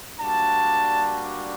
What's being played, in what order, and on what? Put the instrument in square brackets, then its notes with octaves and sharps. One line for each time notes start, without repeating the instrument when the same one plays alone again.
[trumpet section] G3 A#3 D4 F#4 A5